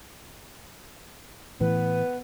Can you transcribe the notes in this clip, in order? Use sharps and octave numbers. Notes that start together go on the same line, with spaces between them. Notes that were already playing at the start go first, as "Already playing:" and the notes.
A2 E3 B3 B4